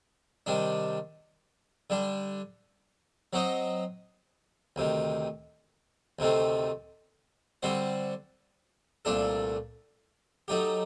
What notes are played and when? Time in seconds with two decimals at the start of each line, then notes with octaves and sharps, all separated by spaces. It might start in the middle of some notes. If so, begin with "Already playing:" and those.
0.46 C3 D#3 G3 D4
1.90 D3 G3 D4
3.33 F#3 C4 F#4 C5 D#5
4.76 D2 C3 D#3
6.19 D2 C3 D#3 A3 C4
7.63 D3 G3 C4 F#4 C5
9.05 C2 A#2 A3 D4 A4
10.48 F#3 A3 D#4 G4